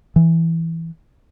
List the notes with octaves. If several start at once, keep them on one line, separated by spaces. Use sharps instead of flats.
E3